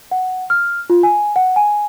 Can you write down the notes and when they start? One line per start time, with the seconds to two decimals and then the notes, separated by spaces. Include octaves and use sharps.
0.11 F#5
0.50 F6
0.90 F4
1.03 G#5
1.36 F#5
1.56 G#5